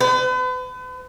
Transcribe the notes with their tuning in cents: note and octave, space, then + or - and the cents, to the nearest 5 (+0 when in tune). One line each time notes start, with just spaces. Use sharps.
B4 +40